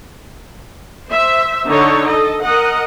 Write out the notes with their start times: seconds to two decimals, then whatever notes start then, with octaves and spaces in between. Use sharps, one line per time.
1.08 C5 E5
1.66 D3 D#4 A4 C#5
2.09 A4 D#5
2.42 A#4 D#5 F#5